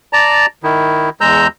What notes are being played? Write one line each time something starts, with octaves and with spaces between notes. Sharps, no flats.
D5 A5 A#5
D#3 E4
E2 G#3 A#5 E6 G6